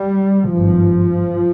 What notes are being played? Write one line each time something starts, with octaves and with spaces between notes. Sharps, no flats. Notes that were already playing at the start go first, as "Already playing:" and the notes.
Already playing: G3
G#1 G2 F3